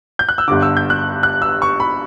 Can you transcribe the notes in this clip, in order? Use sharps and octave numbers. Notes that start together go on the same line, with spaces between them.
G6
F#6
E6
G1 G2 D3 D6
E6
G6
F#6
F#6
E6
C#6
B5